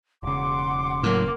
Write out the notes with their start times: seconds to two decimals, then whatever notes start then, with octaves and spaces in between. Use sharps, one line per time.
0.23 E1 C#3 F#5 C6 D6
1.03 A2 F#3 A#3